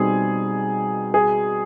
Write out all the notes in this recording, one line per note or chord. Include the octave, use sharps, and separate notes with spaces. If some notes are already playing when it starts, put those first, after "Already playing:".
Already playing: B2 G3 C4 D#4 G#4
G#4